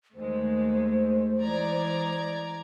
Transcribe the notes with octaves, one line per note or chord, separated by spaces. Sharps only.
D#2 G#3 A3 C5
E3 G#3 D5 A#5 G#6